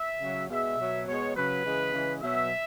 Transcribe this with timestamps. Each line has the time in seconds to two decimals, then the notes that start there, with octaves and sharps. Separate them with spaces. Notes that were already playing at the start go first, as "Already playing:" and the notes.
Already playing: E5
0.20 C#3 F#3
0.50 B2 G#3 E5
0.78 B2 F#3
1.07 B2 G#3 C#5
1.35 C#3 F#3 B4
1.64 C#3 E3 G#3
1.93 C#3 E3 G#3
2.21 B2 F#3 E5